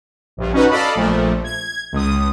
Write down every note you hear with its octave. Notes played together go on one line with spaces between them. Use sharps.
A#1 G2
C#4 D#4 F#4 B4
A4 D5 D#5 F5 A5 B5
A#1 A#2 F3 A3
G#6
C#2 D#6